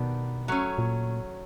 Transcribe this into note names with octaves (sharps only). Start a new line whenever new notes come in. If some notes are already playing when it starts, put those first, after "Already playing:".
Already playing: B2 D#3 G3 B3 D4
F#3 A3 C#4
A#2